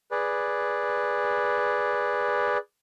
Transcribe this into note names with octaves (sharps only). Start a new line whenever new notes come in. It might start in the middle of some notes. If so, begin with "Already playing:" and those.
G#4 B4 D5